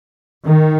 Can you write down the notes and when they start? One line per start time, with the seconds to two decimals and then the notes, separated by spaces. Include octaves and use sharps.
0.45 D#3